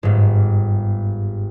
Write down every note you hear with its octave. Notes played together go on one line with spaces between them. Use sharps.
G1 G#2